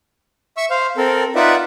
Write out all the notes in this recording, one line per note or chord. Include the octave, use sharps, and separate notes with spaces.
E5 C#6 E6
C5 F5
C4 A4 A#4
D#4 F4 B4 D5 E5 F#5